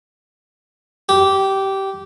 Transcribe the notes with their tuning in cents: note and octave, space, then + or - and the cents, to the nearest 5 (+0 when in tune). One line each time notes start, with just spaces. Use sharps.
G4 -15